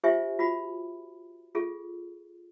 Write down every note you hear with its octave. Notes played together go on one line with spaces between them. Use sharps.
F4 G4 C5 E5 G#5 C#6
F4 F#4 B5
F4 G#4 A4